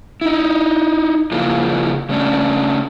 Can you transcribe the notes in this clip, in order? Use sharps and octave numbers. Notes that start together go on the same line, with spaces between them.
D#4 E4
C#3 F3 A#3 E4 F4 G#4
C#3 A3 C#4 D4